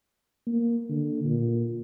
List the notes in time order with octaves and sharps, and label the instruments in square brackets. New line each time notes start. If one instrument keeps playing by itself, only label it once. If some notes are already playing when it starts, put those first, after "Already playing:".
[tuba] A#3
D3
A#2